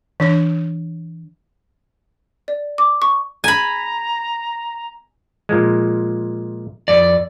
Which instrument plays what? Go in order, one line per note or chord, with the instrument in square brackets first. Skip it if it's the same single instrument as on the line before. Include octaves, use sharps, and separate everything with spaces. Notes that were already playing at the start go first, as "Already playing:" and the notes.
[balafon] E3 D4 C#5
[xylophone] D5
D6
C#6
[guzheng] G#5 B5 [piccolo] A#5
[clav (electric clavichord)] A#2 F3 G#3
[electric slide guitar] F2 D5